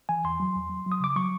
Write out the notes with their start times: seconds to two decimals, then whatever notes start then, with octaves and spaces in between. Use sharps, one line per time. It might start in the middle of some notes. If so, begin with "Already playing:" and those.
0.09 E3 G#5
0.24 E2 C6
0.40 F#3
0.55 E2
0.70 F#3
0.86 F#3
0.92 D#6
1.00 C#3 D6
1.16 F#3 C#6